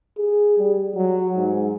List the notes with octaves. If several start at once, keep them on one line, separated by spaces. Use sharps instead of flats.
G#4
G3
F#3
G#2